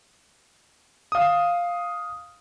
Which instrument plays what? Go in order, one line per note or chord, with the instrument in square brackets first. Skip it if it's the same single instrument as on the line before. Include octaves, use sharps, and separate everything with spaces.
[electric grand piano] F5 D#6